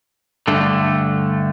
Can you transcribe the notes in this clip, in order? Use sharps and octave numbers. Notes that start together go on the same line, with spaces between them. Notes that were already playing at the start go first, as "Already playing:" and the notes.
G2 D3 A3